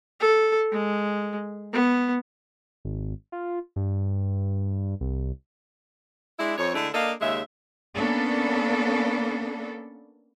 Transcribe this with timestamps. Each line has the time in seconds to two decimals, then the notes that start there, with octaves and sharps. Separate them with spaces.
0.21 A4
0.72 G#3
1.73 B3
2.85 G#1
3.32 F4
3.76 G2
5.01 C2
6.39 G#3 D4 E4
6.58 F2 C#5
6.74 D3 G#3 A3 D4 E4
6.94 A#3 D4 A4 D#5 F5
7.21 D#2 C#3 G#3 E5
7.95 A#3 B3 C#4 D4 A4